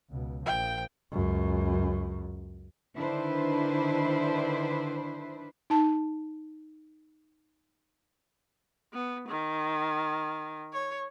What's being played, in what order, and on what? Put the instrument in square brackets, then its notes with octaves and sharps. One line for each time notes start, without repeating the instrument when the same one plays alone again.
[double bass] C#2 B2
[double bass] A#1 F3 [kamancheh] G5
[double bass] C#2 F#2
[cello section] D3 D#3 D4 E4 B4 C5
[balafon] D#4 A5
[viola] B3
D#3
C#5